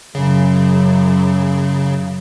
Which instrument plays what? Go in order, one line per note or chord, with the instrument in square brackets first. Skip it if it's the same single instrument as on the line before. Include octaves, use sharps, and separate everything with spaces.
[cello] F#2 [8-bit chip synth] C#3